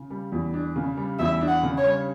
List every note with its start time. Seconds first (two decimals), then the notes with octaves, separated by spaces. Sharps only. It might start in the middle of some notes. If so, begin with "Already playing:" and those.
Already playing: C#3
0.10 G3
0.32 E2
0.54 D4
0.76 C#3
0.97 G3
1.19 E2 E5
1.41 D4
1.48 F#5
1.63 C#3
1.78 C#5
1.85 G3